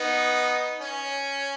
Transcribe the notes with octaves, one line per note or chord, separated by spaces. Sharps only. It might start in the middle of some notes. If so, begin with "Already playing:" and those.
Already playing: B3 D#4
C#4